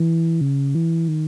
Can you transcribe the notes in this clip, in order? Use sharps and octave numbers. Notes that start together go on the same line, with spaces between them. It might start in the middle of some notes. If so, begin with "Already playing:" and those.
Already playing: E3
C#3
E3
D#3